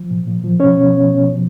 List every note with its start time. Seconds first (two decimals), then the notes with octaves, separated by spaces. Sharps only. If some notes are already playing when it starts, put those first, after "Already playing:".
Already playing: F3
0.11 A#2
0.27 A#2
0.44 F3
0.60 B2 C#4 C#5
0.76 B2
0.93 B2
1.10 B2
1.26 F3